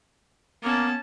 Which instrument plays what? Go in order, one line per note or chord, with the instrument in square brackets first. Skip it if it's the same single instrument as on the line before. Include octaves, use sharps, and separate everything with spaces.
[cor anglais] A#3 [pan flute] B3 [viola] C#4 A5